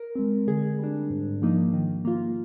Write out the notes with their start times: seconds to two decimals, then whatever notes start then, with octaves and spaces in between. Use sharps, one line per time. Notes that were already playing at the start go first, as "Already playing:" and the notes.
Already playing: A#4
0.15 G#3 C4
0.47 D3 G#4
0.79 G3 D4
1.10 G#2
1.42 F3 A#3 D#4
1.73 D#3
2.05 A#3 F4